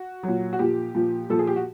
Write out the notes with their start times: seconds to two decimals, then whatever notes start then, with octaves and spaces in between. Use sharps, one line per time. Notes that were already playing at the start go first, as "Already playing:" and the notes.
Already playing: F#4
0.23 A#2 F#3
0.53 F#4
0.59 A#2 F3 G4
0.95 A#2 F3
1.30 A#2 F3 A4
1.39 G#4
1.47 G4
1.56 F#4